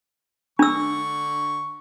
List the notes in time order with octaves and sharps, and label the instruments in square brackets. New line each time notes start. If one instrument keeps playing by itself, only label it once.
[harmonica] D3 C#6 [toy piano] D4 E6